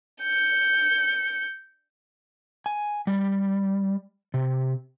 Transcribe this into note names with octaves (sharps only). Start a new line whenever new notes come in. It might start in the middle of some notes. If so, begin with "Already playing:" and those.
G6 C#7
G#5
G3
C3